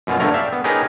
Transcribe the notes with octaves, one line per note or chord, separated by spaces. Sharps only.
F#2 B2 F4
G2 D3 A3 A#4 C#5 A#5
D5 E5 F5 G5
B3
C#4 D#4 G4 G#4 A#4 B4